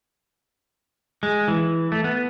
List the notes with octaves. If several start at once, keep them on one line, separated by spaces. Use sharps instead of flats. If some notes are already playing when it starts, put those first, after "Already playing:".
G#3
E3
A3
B3